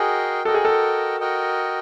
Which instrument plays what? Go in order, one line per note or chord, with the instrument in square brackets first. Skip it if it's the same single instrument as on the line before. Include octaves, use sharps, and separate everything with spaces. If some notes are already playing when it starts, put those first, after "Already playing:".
Already playing: [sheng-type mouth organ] F#4 A#4 D#5 G5 [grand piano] G#4
[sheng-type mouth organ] F#4 A#4 D#5 G5 [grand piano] A4
[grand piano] G#4
A4
[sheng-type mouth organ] F#4 A#4 D#5 G5